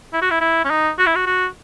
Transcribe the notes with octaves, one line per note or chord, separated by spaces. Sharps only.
E4
F#4
E4
E4
C#4
D#4
F#4
E4
F#4
F#4